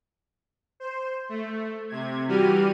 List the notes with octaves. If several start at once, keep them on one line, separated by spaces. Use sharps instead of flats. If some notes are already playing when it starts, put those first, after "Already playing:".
C5
A3
C3 G#6
E3 G3 F#4 G4 F6 D#7